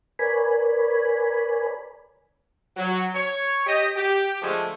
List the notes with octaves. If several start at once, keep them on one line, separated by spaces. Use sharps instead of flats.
A#4 B4 C#5 D5 G#5 B5
F#3
C#5
G4 D#5
G4
D3 F3 G#3 A3